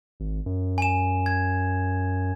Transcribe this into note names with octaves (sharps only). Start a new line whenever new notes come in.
G#1
F#2
G#5 E7
G#6